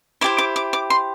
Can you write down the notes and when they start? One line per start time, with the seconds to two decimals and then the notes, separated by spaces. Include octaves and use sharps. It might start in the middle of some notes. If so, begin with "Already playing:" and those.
0.21 E4 G4 C5 D6
0.38 D6
0.56 D6
0.73 D6
0.90 C6